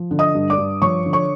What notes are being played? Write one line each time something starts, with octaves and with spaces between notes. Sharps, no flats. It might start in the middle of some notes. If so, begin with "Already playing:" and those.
Already playing: F3
D3
D#5 D#6
G2
D5 D6
G2
F3 C#5 C#6
D3
C#5 C#6